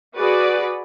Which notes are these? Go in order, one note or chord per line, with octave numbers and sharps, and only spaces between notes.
F#4 G#4 B4 D5